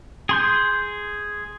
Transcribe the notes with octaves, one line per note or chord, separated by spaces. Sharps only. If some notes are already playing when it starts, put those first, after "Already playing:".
G#4 C6 G6